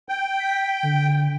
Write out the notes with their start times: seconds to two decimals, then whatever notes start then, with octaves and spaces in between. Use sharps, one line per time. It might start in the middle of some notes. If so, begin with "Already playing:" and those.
0.09 G5
0.39 B6
0.83 D3